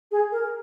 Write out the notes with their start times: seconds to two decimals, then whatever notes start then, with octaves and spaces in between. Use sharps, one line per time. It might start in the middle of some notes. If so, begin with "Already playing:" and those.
0.11 G#4
0.32 A#4